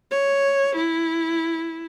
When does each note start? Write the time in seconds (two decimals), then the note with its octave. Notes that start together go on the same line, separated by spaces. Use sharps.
0.11 C#5
0.76 E4